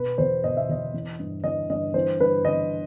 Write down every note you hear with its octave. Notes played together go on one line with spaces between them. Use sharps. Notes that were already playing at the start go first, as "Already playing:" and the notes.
Already playing: B2 B4
E2 C5
B2 D#5
E5
E2 D#5
E3
G2
E3 D#5
G2 D#5
E3 C5
G2 B4
E3 D#5